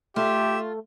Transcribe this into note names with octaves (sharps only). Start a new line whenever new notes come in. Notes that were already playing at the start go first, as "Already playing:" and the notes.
A3 F4 G4 E5